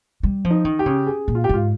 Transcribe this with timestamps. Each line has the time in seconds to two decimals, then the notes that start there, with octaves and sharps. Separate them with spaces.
0.23 G3
0.44 F3
0.51 D#4
0.65 D#3
0.79 G4
0.86 C#3
1.07 G#4
1.28 A#2
1.35 F4
1.44 G4
1.49 G#2 F4